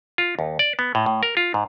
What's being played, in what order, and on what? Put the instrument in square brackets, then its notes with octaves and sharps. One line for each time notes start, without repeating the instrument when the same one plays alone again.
[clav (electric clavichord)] F4
D#2
D5
B3
A2
A2
A#4
F4
G#2